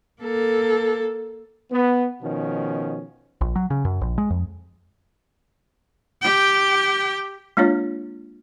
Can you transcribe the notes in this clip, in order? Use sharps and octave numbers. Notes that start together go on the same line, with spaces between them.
A#3 A4
B3
B2 D#3 F3 C#4
A#1
F#3
C#3
F#2
A#1
G#3
F2
G4 G5
G#3 A#3 D4 F4 C#5